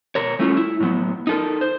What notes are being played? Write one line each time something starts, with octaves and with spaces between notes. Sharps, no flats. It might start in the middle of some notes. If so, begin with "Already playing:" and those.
B2 A#4 C#5
G3 A3 C#4 E4 F4
E4
A2 F#3 B3
D#4 A4 A#4
C5